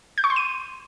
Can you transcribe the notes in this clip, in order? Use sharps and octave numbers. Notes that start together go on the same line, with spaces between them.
G6
C#6
C6
D#7